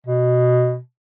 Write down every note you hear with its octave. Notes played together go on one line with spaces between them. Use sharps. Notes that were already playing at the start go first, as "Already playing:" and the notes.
B2